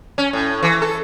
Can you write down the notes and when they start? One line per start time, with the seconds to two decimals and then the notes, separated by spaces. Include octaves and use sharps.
0.18 C#4
0.33 A2
0.63 E3
0.82 A4